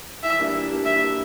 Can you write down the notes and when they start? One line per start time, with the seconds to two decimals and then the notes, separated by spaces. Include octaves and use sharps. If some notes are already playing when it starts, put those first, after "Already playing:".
0.23 E3 E5
0.39 G3 A#3 D4
0.54 E3
0.71 G3 A#3 D4
0.85 E3 E5
1.02 G3 A#3 D4